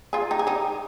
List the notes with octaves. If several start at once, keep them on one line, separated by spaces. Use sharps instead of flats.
F4 G#4
D#4 G4
G#4
D#4 G4